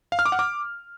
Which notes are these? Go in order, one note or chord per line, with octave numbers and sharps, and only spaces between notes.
F5
F6
D6
F#5
D6